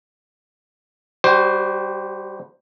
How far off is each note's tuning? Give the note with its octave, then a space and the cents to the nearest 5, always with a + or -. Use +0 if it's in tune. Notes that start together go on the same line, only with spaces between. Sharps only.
G3 +0 F#4 +40 C5 +0